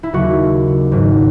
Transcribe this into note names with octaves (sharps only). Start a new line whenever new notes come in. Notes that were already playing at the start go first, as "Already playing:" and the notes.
E4
D#2 C#3 F#3 F#4
G#1 G#2 F#3